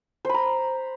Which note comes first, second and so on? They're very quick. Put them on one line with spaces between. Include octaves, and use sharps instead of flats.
C5 B5 A#5